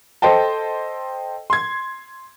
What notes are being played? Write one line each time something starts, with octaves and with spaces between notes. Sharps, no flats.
A4 C5 D#5 G5 A5
C6 G#6